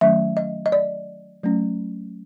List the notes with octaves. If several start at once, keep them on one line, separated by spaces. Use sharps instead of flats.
D#3 F#3 A3 C#4 E5
D#5
D#5
D5
F#3 A3 C#4